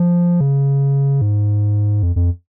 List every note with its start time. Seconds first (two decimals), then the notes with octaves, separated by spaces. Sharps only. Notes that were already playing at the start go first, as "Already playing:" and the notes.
Already playing: F3
0.41 C#3
1.21 G#2
2.03 F2
2.16 F2